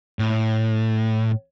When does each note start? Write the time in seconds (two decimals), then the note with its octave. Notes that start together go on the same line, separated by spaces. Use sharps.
0.19 A2